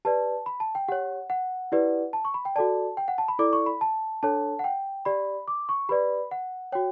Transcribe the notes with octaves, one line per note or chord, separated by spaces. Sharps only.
G4 B4 D5 A5
B5
A5
G5
G4 C#5 F#5
F#5
E4 G4 B4 D5
A5
C#6
B5
G5
F#4 A4 D5 A5
G5
F#5
A5
B5
E4 A4 D5 D6
C#6
B5
A5
D4 A4 C#5 A5
F#5
G5
G4 D5 B5
D6
C#6
G4 B4 D5 B5
F#5
F#4 C#5 G5